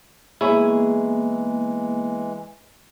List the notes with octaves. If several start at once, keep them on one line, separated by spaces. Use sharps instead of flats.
E3 G#3 A#3 B3 E4 G#4 C#5 E5